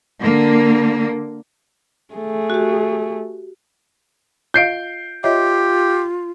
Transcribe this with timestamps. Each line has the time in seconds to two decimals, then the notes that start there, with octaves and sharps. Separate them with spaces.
0.19 D3 A#3
2.14 A3 G#4
2.50 F#4 G4
4.54 F4 D#5 F5 G6 C7 D7
5.24 F4 G4 C#5 D#5 E5